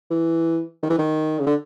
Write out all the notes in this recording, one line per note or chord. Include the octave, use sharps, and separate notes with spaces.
E3
D#3
E3
D#3
C#3
D3